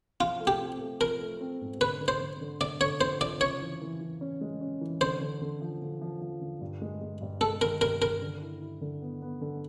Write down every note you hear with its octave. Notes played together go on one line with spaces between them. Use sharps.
F3 F4
A3
G4
C4
A3
F3 A#4
A3
C4
G#2
D3 B4
D3
C5
D3
D3
D3 D5
D3 C#5
F2 C5
F3 D5
C#3 C#5
E3
E3
E3
C#4
G#3
C#4
E3
D3 C5
D3
D3
F3
D3
F3
F3
D3
G2
G#3
G#3
G2
G#3 A4
D#3 A#4
G2 A#4
D#3 A#4
D3
E4
E4
D3
B3
B3
D3